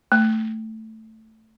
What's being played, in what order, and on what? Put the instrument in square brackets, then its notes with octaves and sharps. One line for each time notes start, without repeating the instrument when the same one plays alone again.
[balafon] A3